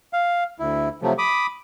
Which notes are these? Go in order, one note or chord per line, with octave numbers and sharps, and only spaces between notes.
F5
D2 E4
C3 F3 F#3 A3
B5 D6 D#6